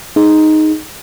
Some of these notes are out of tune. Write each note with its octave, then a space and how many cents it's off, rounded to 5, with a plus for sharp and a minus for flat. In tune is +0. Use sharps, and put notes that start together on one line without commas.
D#4 +0 G#4 +15